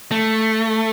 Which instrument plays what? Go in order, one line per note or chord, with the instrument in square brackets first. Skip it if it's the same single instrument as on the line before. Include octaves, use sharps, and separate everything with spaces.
[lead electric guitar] A3